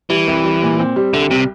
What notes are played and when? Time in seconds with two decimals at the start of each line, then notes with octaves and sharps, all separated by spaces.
0.10 E3 G3
0.27 C2
0.44 G3
0.62 A#2
0.79 C4
0.96 G3
1.13 C2 D3
1.30 C3 G3